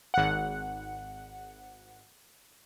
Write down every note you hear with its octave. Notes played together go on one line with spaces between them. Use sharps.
G#1 F#5